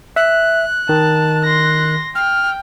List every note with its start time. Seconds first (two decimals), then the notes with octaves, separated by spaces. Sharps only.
0.16 E5 F#6
0.89 D#3 A5
1.45 C6 A#6
2.15 G5 F6